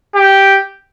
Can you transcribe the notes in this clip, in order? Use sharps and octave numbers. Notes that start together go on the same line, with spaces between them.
G4